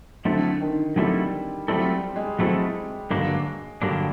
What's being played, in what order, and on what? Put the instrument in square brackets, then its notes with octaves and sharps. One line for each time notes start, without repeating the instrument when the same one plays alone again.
[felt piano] D3 [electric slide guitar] F#3 A3 C4 E4 A4
[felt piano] D#3
[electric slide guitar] F#3 A3 C4 E4 A4 [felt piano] G3
[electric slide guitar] F#3 A3 C4 E4 A4 [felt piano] G3
[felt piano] G#3
[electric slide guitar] F#3 A3 C4 E4 A4 [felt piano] G#3
[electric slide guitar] G2 D3 F#3 A#3 D4
[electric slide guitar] G2 D3 F#3 A#3 D4 [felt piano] G3